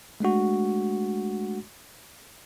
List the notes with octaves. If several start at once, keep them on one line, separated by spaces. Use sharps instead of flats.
G#3 A3 D4 F#4